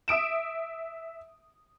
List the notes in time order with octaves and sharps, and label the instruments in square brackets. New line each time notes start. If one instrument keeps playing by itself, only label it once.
[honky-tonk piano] E5 D#6 D7 E7